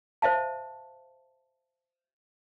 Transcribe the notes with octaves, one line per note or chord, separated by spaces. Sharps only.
C5 E5 F5 A5